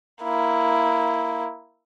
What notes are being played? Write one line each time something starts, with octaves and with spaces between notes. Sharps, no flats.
A#3 E4